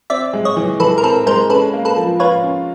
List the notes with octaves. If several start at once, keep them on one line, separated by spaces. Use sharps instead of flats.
C4 D5 E5
G#3
C#5 D#5
E3
E3 A4 B4
A#4
C4 A4 B4
G#3 A#4 C5
C#4 A4 B4
A#3
A4 B4
F3
F4 B4 C#5
C#4